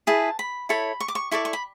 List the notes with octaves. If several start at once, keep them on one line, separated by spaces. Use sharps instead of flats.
E4 G#4 B4 A5
B5
E4 A4 C#5 B5
C#6
D6
C#6
E4 A4 D5 C#6
C#6
B5